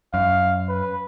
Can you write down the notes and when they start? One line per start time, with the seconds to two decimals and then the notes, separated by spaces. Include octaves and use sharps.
0.14 F#2 F5
0.69 B4